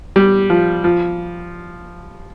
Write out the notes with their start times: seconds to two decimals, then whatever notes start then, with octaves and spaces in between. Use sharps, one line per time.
0.16 G3
0.50 F3
0.84 F3